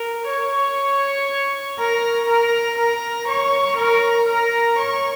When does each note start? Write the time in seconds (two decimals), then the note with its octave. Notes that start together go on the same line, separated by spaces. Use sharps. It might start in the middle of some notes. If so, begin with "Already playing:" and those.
Already playing: A#4
0.28 C#5 C#6
1.78 A#4 A#5
2.28 A#4 A#5
2.78 A#4 A#5
3.27 C#5 C#6
3.78 A#4 A#5
4.27 A#4 A#5
4.78 C#5 C#6